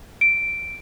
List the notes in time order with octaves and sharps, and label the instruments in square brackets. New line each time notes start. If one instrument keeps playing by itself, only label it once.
[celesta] D7